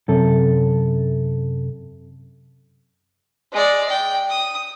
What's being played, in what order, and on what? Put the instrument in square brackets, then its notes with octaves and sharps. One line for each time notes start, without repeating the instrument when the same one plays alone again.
[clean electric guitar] F#2 C3 A4
[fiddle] G#3 D5
G5
D#6